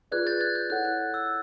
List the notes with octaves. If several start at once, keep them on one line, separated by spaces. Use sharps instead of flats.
F4 G#4 B4 D5 F#6 G#6
G6 A6
F#6 G#6
G6
E4 A4 C#5 F#5 F#6
F#6
E6